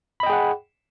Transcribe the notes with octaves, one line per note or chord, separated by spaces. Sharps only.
G#4 D#5 F#5 G5 B5